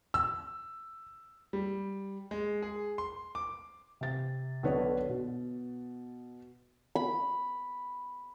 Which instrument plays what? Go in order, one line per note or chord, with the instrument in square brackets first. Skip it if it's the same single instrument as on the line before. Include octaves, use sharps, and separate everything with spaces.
[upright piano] E6
[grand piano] G3
G#3
G#4
C6
D6
[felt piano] C3 A6
B1 D3 B4 C#5
B2
[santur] B5